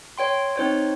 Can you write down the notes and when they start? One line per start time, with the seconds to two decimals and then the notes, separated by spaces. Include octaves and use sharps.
0.18 C#5 G5 C6
0.56 C4 D#4 C5 C#5